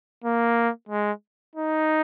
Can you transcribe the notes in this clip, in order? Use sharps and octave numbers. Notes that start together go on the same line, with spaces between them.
A#3
G#3
D#4